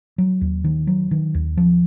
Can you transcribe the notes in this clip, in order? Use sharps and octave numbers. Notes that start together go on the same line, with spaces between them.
F#3
D#2
D#3
F#3
D#3
D#2
F3